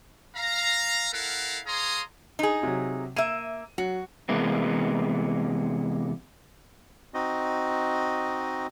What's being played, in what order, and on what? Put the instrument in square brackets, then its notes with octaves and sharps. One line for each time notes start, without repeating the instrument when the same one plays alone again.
[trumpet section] F5 A#5
E4 A4 A#4 F5 F#5
G#4 C#5 F5 A#5 C6 D#6
[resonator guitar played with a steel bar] D#4 G#4
[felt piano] C3 F#3
[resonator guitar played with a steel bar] A#3 E5 [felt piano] D#7
[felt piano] F#3 [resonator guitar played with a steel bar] F#4
[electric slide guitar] C3 E3 G#3 A#3 B3
[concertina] C4 D#4 F#4 D#5